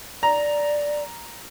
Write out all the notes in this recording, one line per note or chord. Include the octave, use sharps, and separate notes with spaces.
D5 A#5